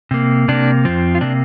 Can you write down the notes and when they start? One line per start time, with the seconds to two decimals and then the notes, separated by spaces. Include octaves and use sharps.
0.11 C3 A#3
0.48 C3 A#3 D4
0.85 F2 F3 C4
1.15 F4
1.21 C3 A#3 D4